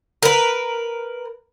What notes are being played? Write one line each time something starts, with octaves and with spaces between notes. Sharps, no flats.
A#4 B4